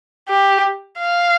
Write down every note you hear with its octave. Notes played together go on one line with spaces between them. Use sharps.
G4
F5